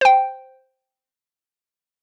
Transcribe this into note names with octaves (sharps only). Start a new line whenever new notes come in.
C5 G5